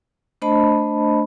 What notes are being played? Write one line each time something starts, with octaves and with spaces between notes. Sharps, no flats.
A3 D4 C5 D#5 A5 B5